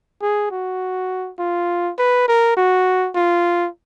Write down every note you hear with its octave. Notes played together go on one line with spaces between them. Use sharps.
G#4
F#4
F4
B4
A#4
F#4
F4